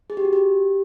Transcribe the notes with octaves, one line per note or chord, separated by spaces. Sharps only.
G#4
G4
F#4
G4